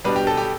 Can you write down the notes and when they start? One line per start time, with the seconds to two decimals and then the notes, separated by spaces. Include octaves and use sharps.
0.04 B2 G3 D4 B4
0.16 G4
0.27 A4
0.37 G4